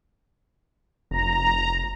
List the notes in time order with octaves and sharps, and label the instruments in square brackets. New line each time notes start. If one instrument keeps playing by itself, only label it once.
[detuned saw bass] F1 [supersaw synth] A#5